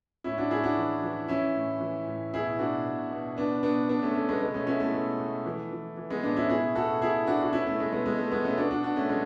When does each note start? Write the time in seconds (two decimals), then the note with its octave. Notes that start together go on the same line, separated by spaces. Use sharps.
0.24 A2 C#4 E4
0.38 D4 F#4
0.50 A2 E4 G#4
0.63 D4 F#4
0.77 E3
1.02 E3
1.28 E3 C#4 E4
1.54 A2
1.80 E3
2.06 A2
2.33 B2 E4 G#4
2.59 B2 D4 F#4
2.85 B2
3.11 B2
3.37 B2 B3 D4
3.63 B2 B3 D4
3.89 B2 B3 D4
4.02 A3 C#4
4.15 B2 A3 C#4
4.29 G#3 B3
4.41 B2 G#3 B3
4.54 A3 C#4
4.67 B2 C#4 E4
4.80 A3
4.94 B2
5.19 B2
5.46 E3
5.72 E3
5.97 E3
6.10 G#3 B3
6.23 A2 B3 D4
6.36 C#4 E4
6.49 B2 E4 G#4
6.75 B2 F#4 A4
7.01 B2 E4 G#4
7.27 B2 D4 F#4
7.43 F#4
7.53 B2 C#4 E4
7.67 A3
7.79 B2 G#3
7.92 G#3 B3
8.06 B2 G#3
8.18 A3
8.31 B2 G#3 B3
8.44 A3 C#4
8.58 B2 D4 F#4
8.71 D4 F#4
8.83 B2 D4 F#4
8.96 A3 C#4
9.09 B2 G#3